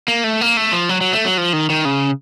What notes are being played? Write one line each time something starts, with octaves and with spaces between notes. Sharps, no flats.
A#3
A3
A#3
A3
F3
F#3
F#3
A3
F#3
F3
D#3
D#3
C#3